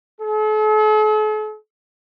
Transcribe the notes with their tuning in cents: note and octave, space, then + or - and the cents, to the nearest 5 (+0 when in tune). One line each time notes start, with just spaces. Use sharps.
A4 -45